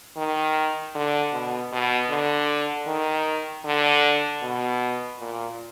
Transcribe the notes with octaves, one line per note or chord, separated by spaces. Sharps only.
D#3
D3
B2
B2
D3
D#3
D3
B2
A#2